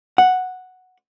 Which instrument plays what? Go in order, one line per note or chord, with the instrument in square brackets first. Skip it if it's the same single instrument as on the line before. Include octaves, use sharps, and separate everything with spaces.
[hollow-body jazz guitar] F#5